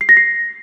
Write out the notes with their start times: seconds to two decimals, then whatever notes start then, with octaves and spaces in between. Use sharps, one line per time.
0.01 C7
0.09 A#6
0.17 C7